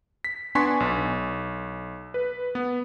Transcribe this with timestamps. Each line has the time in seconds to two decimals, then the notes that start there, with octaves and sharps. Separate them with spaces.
0.24 B6
0.55 B3 D4 G#5 C6 C#6 B6
0.80 B1
2.14 B4
2.55 B3